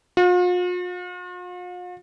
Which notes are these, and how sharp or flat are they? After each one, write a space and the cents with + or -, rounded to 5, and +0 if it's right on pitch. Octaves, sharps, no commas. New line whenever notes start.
F4 +45